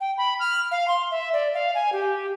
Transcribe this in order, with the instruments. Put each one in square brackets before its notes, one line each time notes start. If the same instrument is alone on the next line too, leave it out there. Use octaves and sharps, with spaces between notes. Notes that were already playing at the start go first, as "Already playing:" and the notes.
[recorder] G5
B5
F6
F5
C6
E5
D5
F5
G#5
G4